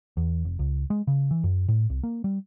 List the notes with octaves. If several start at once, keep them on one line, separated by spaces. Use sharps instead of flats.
E2
F1
C#2
G#3
C#3
E3
F#2
A2
C2
A#3
G3